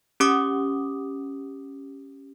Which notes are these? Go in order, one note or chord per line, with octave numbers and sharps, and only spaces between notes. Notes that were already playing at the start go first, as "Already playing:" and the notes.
C#4 G4 D6 D#6